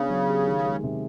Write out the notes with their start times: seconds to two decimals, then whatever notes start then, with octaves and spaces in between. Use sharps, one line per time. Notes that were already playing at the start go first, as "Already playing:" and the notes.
Already playing: C#3 B3 D4
0.10 F#3
0.28 G4
0.47 D#3
0.65 G#3
0.83 C3